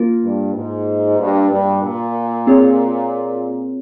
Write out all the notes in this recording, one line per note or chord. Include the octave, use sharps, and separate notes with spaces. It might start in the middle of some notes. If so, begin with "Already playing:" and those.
Already playing: A#3 F4 A#4
G2
G#2
G2
G2
A#2
C4 F4 G#4 C#5